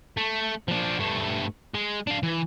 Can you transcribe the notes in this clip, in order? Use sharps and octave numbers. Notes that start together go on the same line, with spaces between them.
A3
F3 D4
G2 A3
G#3
D4 F5
E3